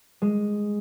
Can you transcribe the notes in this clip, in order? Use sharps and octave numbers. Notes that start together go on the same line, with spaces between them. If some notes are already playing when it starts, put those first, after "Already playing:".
G#3